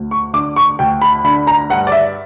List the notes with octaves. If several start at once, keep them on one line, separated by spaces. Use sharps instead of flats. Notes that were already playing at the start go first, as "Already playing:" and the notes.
Already playing: D2
C#6
D3 D6
C#6
D2 G5
B5
D3 B5
A#5
G2 F#5
D5
E5